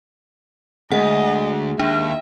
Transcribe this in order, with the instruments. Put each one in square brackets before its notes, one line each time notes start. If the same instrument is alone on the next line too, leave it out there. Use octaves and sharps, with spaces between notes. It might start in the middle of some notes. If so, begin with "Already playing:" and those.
[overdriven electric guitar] D2 [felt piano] G#3 [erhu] D#5 [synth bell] F#5
[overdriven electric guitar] D#2 [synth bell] D4 [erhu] E5